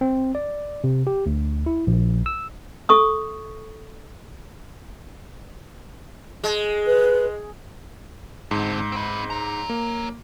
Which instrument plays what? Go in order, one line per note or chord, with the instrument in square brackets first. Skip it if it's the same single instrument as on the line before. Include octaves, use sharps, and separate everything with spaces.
[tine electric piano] C4
D5
C3
G4
D2
E4
A#1
E6
[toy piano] A4 C#6 D#6
[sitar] G#3
[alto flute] B4
[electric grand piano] G#2 [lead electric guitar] D3 C4
[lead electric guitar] C4 B4
C#5 A#5
[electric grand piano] A#3